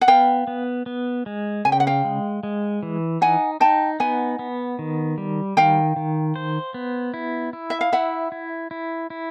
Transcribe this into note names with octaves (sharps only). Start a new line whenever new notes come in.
F#5
B3 F5 G5
B3
B3
G#3
C#3 G#5
G5
F#5
F5 G5
G#3
G#3
E3
D#4 F#5 G#5
D#4 G5 A5
B3 F#5 G#5
B3
D#3
G3
D#3 F5 G5
D#3
C5
B3
E4
E4
E5
F5
E4 E5 F#5
E4
E4
E4